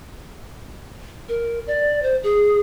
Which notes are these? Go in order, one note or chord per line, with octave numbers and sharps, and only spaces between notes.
A#4
D5
C5
G#4